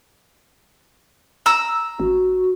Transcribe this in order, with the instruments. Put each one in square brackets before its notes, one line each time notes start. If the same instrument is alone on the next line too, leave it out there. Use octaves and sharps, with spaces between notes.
[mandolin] A#5 E6
[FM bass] A1 [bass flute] F#4